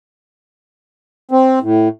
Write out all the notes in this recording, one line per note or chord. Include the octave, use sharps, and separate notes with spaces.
C4
A2